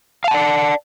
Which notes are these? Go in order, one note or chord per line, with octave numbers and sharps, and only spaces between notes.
D5 F5 F#5 A5